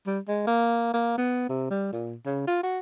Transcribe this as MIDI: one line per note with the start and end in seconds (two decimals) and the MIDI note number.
0.07 0.20 55
0.28 0.45 56
0.47 0.90 58
0.94 1.15 58
1.18 1.47 59
1.49 1.68 48
1.70 1.92 55
1.92 2.15 46
2.26 2.44 49
2.47 2.62 65
2.63 2.79 66